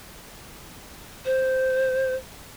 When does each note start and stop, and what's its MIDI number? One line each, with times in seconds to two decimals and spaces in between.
1.25 2.15 72